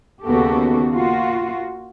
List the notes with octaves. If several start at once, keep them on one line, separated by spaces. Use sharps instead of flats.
D#2 C#3 B3 F#4 G4 A4
A#3 F4 F#4